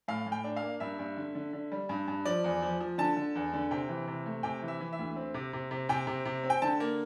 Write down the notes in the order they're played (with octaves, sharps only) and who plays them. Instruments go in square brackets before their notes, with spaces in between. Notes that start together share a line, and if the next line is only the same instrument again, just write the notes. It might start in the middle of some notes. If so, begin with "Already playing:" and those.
[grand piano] A2 F5
A2
G5
D4
F5
A#3
G2 E5
G2
D3
D3
D3
G3
G2
G2
F3 D5
E2
F3
F3
D3 A5
D3
E2
D3
C3 G5
E3
C3
A3
C3 G5
E3
E5
E3
E5
D2
C4
C3
C3
C3
C3 G5
C3
C3
C4
G5
D3 A5
A#3